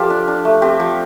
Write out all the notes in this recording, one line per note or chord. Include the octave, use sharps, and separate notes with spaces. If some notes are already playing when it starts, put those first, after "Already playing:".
Already playing: F3 F4 G4 A4 D5
D4
D4
A3
C4 G4
F3